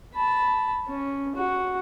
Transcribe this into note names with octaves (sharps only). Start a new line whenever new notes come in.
A5 B5
C#4
F#4